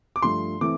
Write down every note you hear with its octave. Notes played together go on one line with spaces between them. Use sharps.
D6
G2 F3 A3 C6
E3 A3 C4 D6